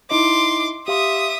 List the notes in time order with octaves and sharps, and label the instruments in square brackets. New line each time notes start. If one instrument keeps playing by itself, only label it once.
[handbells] D#4 E4 D#5 [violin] C6 D6
[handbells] G4 F5 C6 [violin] E5 D#6